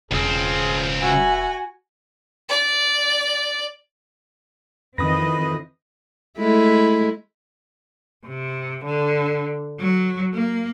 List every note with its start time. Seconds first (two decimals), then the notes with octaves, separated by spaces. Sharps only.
0.11 E1 C#2 C4 F4 G#4
1.02 F#4 B4 E5 G#5
2.49 D5
4.98 F2 D#3 E3 C4 B4 D#5 D#6 A#6
6.38 G#3 A3 E4
8.26 C3
8.85 D3
9.80 F#3
10.34 A#3